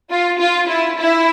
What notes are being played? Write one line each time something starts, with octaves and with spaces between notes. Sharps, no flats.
F4
F4
E4
E4